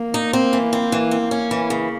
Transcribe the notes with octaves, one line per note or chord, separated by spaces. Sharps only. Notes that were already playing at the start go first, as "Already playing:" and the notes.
Already playing: A#3
D#4
C4
E3
C4
E3
C4
C#4
E3
C#3